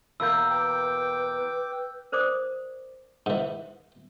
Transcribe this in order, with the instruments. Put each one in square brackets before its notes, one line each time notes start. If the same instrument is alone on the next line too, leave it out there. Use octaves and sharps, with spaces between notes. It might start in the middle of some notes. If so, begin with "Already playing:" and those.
[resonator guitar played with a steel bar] E2 B2 A#3 [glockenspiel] E6 G6
[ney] B4 [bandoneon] G5 D6
[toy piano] A#4 C5 D5 D6 D#6
[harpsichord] G#2 E3